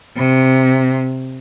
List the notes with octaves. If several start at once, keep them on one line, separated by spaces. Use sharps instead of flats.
C3